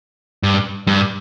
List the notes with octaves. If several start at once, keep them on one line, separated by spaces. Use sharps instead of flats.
G2
G2